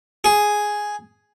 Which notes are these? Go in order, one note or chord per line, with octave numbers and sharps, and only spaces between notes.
G#4